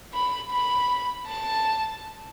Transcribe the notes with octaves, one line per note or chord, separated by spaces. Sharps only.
B5
B5
A5